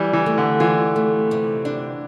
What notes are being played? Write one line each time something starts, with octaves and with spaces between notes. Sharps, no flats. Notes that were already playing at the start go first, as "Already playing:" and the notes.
Already playing: E3 G3
E3
A3
D3
E3 F4
A3
C3
D4